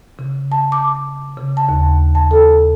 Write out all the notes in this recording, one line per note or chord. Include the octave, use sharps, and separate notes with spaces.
C#3
A5
D6
C#3
A5
D#2
A5
A4